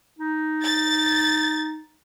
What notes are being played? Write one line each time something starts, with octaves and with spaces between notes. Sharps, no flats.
D#4
A6